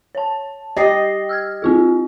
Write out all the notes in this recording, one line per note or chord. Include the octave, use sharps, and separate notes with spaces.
C#5 A5
G4 D#5 A6 A#6 C7
E6 F6 G#6
C4 F4 G#4